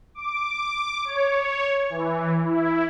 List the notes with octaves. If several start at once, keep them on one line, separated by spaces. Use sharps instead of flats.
D6
C#5
E3
E4